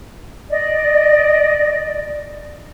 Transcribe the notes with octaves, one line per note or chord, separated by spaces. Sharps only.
D5 D#5